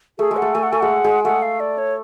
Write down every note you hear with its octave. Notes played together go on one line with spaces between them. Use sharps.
A3 G#4
G#3
F#5
A3
A3 G#5
F#5
A3 G#5
G#3 F#5
G#3
A3 F#5
F5
D5
C#5